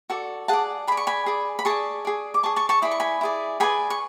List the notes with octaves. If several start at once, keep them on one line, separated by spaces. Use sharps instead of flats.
F#4 A4 D5
G#4 D5 F#5 A5
G#4 D5 B5
C#6
G#5 B5
G#4 D5
B5
G#4 D5 A5 C#6
G#4 D5
D6
G#4 D5 A5 C#6
A5 C#6
A5 C#6
E4 G#4 D5 B5
C#6
G#5 B5
E4 G#4 D5
G#4 B4 D5 G#5 B5
C#6